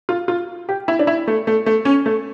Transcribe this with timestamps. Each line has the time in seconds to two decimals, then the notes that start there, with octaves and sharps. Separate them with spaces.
0.09 F4
0.28 F4
0.69 G4
0.88 E4
0.99 D4
1.07 E4
1.28 A3
1.47 A3
1.66 A3
1.85 C#4
2.06 A3